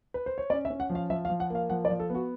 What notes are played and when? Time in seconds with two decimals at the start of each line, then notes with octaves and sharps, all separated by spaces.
0.14 B4
0.26 C5
0.38 C#5
0.50 C#4 D5
0.65 E5
0.70 C#4
0.80 F#5
0.90 F3
0.95 F5
1.10 F3 E5
1.25 F5
1.30 F3
1.40 F#5
1.50 A#3 F5
1.70 F3 F#5
1.85 D5
1.90 F3
2.00 A4
2.10 B3 F#4